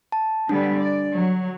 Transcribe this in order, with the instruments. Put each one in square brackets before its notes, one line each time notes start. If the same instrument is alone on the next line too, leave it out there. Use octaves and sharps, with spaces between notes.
[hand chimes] A5
[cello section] D3 G3 B3 [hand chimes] D4
[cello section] D5
F#3